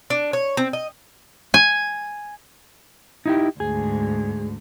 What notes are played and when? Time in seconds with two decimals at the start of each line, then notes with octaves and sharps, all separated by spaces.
0.10 D4
0.33 C#5
0.57 C4
0.73 D#5
1.54 G#5
3.26 D#4 E4 G4
3.60 D2 G#2 G#4